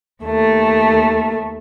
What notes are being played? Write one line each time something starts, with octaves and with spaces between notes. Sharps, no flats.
D#2 A3